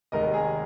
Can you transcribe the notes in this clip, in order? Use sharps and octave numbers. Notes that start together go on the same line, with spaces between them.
F1 D#2 D#3 G#3 A#4 D#5
G#4